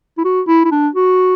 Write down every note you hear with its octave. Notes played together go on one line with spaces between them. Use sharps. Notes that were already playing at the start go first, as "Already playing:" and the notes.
E4
F#4
E4
E4
D4
F#4